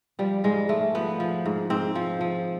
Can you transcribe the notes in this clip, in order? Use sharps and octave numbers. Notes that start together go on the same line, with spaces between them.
F3 G3
G#2 G#3
G#2 A3
F3 B3
F3
G#2
G#2 C4
F3
F3